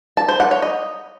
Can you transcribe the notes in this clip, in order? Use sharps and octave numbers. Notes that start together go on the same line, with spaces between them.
A5
C5
F#5
C#5
D#5